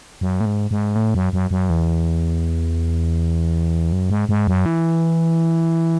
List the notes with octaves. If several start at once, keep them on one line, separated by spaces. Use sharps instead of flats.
F#2
A2
G#2
G#2
A2
F#2
F#2
F#2
E2
F#2
G#2
G#2
F#2
E3